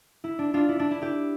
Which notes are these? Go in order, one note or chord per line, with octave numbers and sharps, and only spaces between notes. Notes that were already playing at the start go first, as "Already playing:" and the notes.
E4
D4
D4 F4
E4
D4
E4
E4 G4